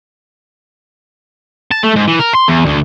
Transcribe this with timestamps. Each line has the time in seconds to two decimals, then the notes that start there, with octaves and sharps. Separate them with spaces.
1.71 A5
1.83 A3
1.96 G#2
2.07 E3
2.20 A#4
2.35 C6
2.48 E2
2.66 D2